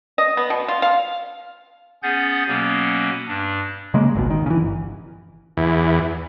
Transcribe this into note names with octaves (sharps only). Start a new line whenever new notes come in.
D#5
B3
B2
F4
F5
B3 C#4 G#4 F#5 G6 A6
B2 F#3 A#3 B3 C#4
G2 D4
C#3 G#3 A#3
G#1 C#2 B2
D#3
C#3 E3
G1
E2